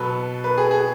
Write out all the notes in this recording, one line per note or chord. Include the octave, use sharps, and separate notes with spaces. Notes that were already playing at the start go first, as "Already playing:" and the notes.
Already playing: B2 F#3 A4 B4
B4
G#4
G#4